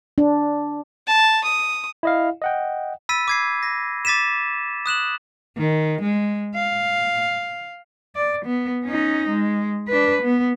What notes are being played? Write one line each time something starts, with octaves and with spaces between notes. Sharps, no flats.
D4
A5
D#6
E4 D#5 F5
D#5 F#5 G5
B5 E6 A6 B6 D#7
D6 G#6 C7
A#6
D6 A6 B6 D#7 E7
D#6 F#6 E7 F#7
D#3
G#3
F5
D5
B3
C#4 D#4
G#3
D4 B4
B3